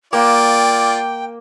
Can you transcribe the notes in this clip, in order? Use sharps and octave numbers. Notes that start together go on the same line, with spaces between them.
A#3 F4 D5 G5